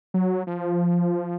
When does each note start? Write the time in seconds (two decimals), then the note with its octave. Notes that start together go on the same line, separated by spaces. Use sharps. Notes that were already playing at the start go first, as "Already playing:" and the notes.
0.14 F#3
0.47 F3